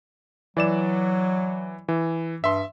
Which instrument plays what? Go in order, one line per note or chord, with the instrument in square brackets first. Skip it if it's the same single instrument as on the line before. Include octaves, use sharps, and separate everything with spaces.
[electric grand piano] E3 D5 E7 [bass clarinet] F#3
[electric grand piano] E3
[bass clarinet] G2 [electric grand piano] E5 C6